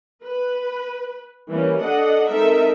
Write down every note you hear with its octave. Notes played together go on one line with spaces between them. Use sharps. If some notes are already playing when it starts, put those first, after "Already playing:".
B4
E3 G3 A#3 C#4
D4 A4 D#5 F#5
G#3 C4 D#4 A4 A#4 E5